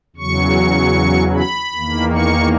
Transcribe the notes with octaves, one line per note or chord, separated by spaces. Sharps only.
E2 C#3 F#3 C#6
B5
E2 D#3 A#3
C#6